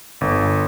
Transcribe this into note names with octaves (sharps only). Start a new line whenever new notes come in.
G1